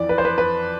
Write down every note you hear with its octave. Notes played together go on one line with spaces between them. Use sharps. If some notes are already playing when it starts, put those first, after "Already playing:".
Already playing: F2 E3 D5
B4
C5
B4
B4